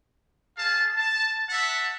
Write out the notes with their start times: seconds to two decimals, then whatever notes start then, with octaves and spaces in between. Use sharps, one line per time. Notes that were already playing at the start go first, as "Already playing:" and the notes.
0.58 G#4 F5 A5
0.96 A5
1.50 E5 F#5 A5